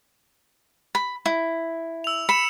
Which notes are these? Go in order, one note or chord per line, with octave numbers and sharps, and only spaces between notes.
B5
E4
E6 F7
B5 C#7 E7